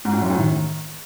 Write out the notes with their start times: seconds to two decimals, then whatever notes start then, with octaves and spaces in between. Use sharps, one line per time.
0.05 G#2
0.13 A2
0.22 F#2
0.30 A2
0.38 D#3